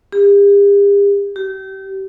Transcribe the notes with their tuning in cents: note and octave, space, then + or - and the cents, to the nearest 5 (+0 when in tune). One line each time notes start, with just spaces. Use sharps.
G4 +45
G4 -30